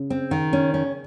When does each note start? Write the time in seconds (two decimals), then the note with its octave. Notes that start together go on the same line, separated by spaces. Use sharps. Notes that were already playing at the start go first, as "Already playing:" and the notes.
Already playing: C#3
0.10 C4
0.31 D#3
0.53 C#4
0.74 C#4